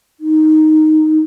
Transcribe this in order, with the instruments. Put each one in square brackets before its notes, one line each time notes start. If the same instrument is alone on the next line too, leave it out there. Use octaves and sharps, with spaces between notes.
[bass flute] D#4